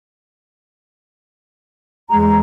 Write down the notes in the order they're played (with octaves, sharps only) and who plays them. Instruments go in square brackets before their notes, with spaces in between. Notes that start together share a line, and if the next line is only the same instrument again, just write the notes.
[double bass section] E2 G#3 [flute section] A#5